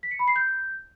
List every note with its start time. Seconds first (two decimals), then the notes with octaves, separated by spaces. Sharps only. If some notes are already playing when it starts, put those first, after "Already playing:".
0.03 B6
0.11 C#7
0.19 B5
0.28 C7
0.36 G6